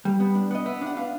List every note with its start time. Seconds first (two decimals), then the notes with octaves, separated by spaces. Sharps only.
0.05 G3
0.20 B3
0.35 D4
0.51 B3 D#5
0.66 B3 E5
0.81 D4
0.87 F#5
0.97 D4 F5